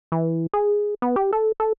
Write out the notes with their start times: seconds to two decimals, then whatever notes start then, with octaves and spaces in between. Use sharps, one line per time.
0.12 E3
0.53 G#4
1.02 B3
1.16 G4
1.33 A4
1.60 A4